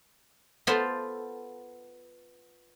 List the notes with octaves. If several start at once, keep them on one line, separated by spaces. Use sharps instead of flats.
B3 F4 A4 C5